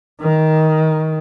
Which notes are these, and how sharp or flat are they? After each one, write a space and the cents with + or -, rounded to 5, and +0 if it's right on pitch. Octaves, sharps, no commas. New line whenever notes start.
D#3 +15